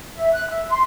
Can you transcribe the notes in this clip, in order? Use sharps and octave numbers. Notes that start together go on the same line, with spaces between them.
E5
F#6
E5
C6